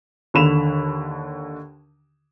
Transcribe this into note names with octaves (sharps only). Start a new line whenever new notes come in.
D#2 D3 B5 E7 F7